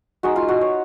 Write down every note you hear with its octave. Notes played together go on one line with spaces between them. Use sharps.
G#3 D#4 F#4
F4
F#4
C#5